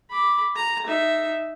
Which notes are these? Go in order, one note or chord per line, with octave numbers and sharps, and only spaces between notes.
B5 D6
A#5
D#4 E5